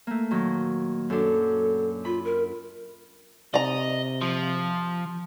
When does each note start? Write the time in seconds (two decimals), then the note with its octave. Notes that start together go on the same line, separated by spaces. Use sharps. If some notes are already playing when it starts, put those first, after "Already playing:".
0.07 A3 A#3
0.31 A#2 D#3 F#3
1.10 F#2 D4 A4
2.05 F4 B5
2.24 A#4
3.54 C3 D5 D#5 A#5
4.21 F3